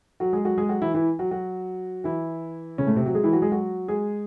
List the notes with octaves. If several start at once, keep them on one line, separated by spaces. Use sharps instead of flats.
F#3 F#4
G#3 G#4
F#3 F#4
G#3 G#4
F#3 F#4
E3 E4
E3 E4
F#3 F#4
F#3 F#4
E3 E4
C#3 C#4
A2 A3
C3 C4
F#3 F#4
G#3 G#4
E3 E4
F#3 F#4
G#3 G#4
F#3 F#4
G#3 G#4